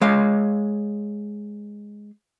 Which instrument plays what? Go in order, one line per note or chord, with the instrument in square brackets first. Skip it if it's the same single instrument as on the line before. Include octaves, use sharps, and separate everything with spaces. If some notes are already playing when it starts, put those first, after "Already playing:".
[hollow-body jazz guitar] G#3 C#5 F5